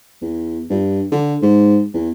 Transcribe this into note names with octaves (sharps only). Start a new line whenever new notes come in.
E2
G2
D3
G#2
E2